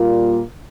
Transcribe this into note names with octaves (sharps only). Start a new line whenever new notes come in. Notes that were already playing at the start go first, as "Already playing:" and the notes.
Already playing: A#2 G3 A#3 F4